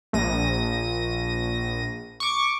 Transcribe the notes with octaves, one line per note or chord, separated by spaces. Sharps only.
A#1 A#6 D#7
C#6 D6